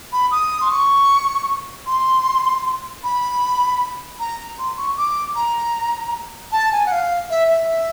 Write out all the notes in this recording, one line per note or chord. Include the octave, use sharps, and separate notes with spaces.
B5
D#6
C6
C#6
C6
B5
A#5
C6
C#6
D6
A#5
A5
G#5
F#5
F5
E5
E5
E5